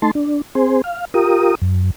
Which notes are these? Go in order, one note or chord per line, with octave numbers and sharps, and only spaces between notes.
A3 D#4 A5 C6
D4
C4 G#4 C5
F5
F4 G4 A#4 D#6
F#2